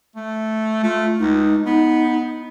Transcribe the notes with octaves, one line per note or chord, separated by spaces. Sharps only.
A3
A3 F4
C#2 D#4
B3 D#4